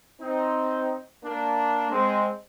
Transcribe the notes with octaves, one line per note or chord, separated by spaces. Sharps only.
C4 D#4
A#3 D4
G#3 C4